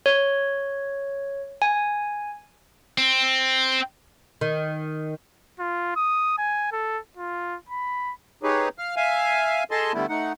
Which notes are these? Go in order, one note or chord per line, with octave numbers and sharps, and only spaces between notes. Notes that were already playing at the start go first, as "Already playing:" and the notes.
C#5
G#5
C4
D#3
F4
D#6
G#5
A4
F4
B5
D#4 G4 G#4 B4 C#5
F5 F6
E5 F5 G#5
G#4 A4 D#5 G#5 A5 C6
D3 G3 A3 B3 E4
A3 D#4 F#5